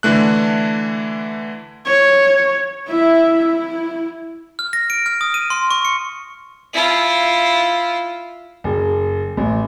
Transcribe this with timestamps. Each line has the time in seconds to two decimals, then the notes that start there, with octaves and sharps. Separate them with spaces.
0.03 D3 E3 A3 F#6
1.86 C#5
2.88 E4 E5
3.46 E4
4.59 F6
4.73 A#6
4.90 D7
5.06 F6
5.21 D#6
5.34 D#7
5.50 C6
5.71 C#6
5.85 C#7
6.74 E4 F4
8.64 F#1
9.37 A1